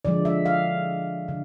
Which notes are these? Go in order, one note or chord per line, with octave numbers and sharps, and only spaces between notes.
D3 F3 G#3 D5
E5
F5
D3